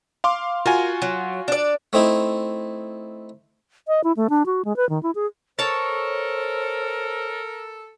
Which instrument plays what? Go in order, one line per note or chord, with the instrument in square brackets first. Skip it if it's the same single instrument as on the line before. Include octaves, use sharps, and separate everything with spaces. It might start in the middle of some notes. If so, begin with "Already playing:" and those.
[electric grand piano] F5 C6 D6
[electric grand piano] F4 F#4 G#5 [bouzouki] A#4
[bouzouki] F#3
D4 D5
[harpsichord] A3 C4 D#4 E4
[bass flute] D#5
E4
A3
D4
F#4
G#3
B4
D#3
E4
G#4
[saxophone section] A4 [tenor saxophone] A#4 [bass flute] C5 [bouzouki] C#5 A5